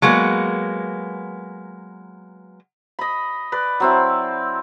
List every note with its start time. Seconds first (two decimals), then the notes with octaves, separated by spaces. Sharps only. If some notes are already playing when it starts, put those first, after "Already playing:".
0.02 F#3 G#3 A#3 B3
2.99 D#5 B5
3.52 B4 D5
3.80 F#3 C4 E4